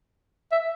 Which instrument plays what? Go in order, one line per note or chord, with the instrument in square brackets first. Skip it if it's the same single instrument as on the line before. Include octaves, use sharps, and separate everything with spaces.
[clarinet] E5